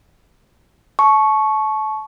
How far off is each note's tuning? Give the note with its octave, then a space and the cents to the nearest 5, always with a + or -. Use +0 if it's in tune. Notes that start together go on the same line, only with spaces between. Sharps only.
A5 -30 C#6 +0